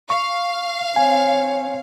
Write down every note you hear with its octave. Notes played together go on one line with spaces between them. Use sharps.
F5 C#6
C4 C#5 G#5